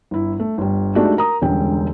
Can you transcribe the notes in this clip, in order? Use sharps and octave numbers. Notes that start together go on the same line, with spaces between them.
G1 E4
A3
G1 G3
G#3 A3 D4 D#4 F#4 G4
A#4 A#5 D#6
E1 C#2 D3 G3 G5